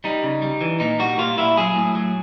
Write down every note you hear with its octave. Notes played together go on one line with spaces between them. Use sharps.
G3 D#4
C#3
G3
E3
A#2 D#4
G3 F#4
A#2 F4
A#2 E4
F#3 G#4
A2
F#3